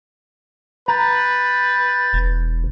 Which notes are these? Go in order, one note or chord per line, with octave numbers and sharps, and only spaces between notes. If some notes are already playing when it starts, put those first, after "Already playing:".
B4 A#5 G6 A6
E1